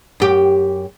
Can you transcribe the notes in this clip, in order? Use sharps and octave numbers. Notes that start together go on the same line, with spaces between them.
F#2 G4